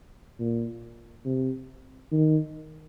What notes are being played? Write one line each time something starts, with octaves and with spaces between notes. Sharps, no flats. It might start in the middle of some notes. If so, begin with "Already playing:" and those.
A#2
C3
D#3